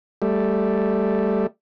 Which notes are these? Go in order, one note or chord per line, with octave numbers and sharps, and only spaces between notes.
G3 A3